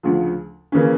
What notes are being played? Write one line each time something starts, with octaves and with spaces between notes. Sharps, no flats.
D2 C#3 F3
C#3 E3 A#3 C#4